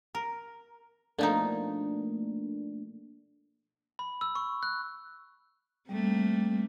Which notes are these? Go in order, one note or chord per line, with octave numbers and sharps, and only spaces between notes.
A#4
B2 F3 A3 A#3 D4 D#4
B5
E6
C#6
F#6
G3 A3 A#3 C4